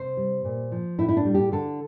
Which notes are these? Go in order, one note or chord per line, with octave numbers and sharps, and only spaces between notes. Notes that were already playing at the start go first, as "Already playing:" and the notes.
Already playing: C3 C5
G3
A#2
F3
A2 E4
E4
D4
G3
G4
D3 A4